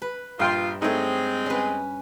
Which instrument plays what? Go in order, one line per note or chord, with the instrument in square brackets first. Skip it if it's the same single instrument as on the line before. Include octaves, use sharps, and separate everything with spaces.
[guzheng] B4
[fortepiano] A#1 G5 C6 [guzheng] G2 [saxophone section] F4
[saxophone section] G#3 C4 [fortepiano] A3 D#4 [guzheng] C#5 D#5
[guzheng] C#4 B4